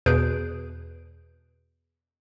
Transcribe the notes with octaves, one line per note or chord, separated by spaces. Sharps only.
E2 B2 G#4 B4 G6 D7